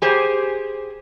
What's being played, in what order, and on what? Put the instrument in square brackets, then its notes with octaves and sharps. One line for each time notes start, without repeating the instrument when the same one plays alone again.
[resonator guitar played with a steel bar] G4 G#4 C5